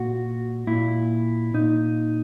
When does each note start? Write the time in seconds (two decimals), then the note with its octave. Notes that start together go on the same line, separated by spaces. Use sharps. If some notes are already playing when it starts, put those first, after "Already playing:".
Already playing: A#2 F#4
0.67 A#2 E4
1.54 A#2 D#4